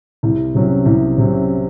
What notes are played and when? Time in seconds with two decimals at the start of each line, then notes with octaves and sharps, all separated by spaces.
0.23 C2
0.55 C3 F#3 C#4
0.86 C2
1.18 C3 F#3 C#4